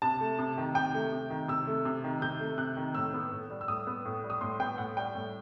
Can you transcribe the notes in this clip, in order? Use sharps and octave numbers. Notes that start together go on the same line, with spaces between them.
C3 A5
A3
C3
D#3
C3 G5
A3
C3
D#3
C3 E6
A3
C3
D#3
C3 G6
A3
C3 F#6
D#3
A2 E6
B3
A2
G3
E6
A2 D#6
B3
A2
G3
D#6
A2 C6
B3 G5
A2 F#5
G3 G5
A2